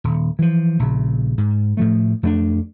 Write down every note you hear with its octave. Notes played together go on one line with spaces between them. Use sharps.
D#1
E3 F3
A#1 C#3
G#2
A2 F3 A3
F2 A3 A#3 D4